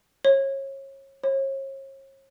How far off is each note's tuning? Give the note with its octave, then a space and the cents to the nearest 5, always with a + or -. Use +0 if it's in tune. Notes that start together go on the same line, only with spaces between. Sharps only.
C#5 -30
C#5 -40